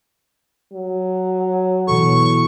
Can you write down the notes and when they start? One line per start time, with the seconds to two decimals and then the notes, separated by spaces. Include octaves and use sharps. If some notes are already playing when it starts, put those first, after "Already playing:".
0.73 F#3
1.88 B2 E3 A4 C#6